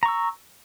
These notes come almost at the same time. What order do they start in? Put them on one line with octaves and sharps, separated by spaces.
A#5 C#6 E6